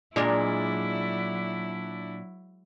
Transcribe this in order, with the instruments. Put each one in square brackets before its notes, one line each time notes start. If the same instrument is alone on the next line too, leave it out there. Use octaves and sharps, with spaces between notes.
[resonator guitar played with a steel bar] A#2 [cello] F#3 E4 [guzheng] G#3 A#4 [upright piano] D4